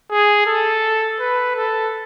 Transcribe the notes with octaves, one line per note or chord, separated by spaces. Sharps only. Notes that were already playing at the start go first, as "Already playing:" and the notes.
G#4
A4
B4
A4